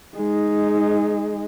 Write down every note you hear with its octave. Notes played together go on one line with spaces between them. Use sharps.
G#3 D#4